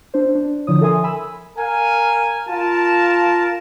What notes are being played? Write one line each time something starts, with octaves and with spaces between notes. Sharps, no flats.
D4 C5
D4
D3 F3 E4 C#5 D#6
A4 A#4 E5 G#5 C6 D#6
G#5 B5 E6
A#4 F5 G#5
F4 A#4 A5